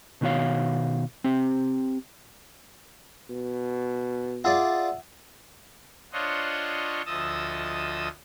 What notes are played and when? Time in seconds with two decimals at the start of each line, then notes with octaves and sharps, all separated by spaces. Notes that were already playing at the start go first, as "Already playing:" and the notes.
0.21 B2 D#3 B3 F#4 C#5 F5
1.24 C4 G4
3.30 B2
4.44 F4 G#4 D5 E5 F#5 E6
6.13 D4 F4 C5 C#5 D#5 F#5
7.06 D2 F3 D#5 A5 D#6 E6